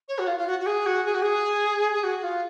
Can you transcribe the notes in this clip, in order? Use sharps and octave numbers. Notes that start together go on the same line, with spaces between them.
C#5
F#4
F4
F4
F#4
F#4
G#4
F#4
G#4
F#4
G#4
G#4
F#4
F4